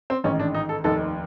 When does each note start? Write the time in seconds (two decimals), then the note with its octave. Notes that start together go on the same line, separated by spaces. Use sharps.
0.10 C4
0.24 A1 G#2 D#3 C#4
0.40 D4
0.54 D#4
0.69 A4
0.84 F1 D#2 D#3 A4